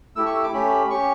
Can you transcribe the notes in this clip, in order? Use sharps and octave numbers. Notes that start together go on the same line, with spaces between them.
A3 E4 G4 E6
C#6
E6
D6
A3 C#4 G4 B5
C#4 G4 C#6